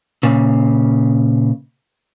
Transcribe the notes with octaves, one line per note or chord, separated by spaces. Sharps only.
A#2 C#3